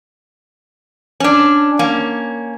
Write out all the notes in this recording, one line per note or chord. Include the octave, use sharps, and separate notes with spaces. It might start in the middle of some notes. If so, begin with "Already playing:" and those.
C#4 D4
A#3 C#4